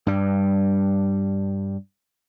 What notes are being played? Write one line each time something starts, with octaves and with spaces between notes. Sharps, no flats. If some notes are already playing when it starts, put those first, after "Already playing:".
G2 G3